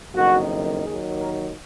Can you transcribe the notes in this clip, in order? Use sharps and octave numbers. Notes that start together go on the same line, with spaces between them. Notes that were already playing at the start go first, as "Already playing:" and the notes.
F#1 F2 D#3 F#4
D#2 D#3 F#3 G#4
A#4